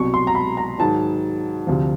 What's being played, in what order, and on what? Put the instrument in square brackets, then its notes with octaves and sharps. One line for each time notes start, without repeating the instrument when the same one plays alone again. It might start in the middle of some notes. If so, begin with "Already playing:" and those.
Already playing: [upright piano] C2 B2 F#3 C#6
C6
A#5
B5
A#5
G#2 D#3 F#3 A5
D2 C3 F3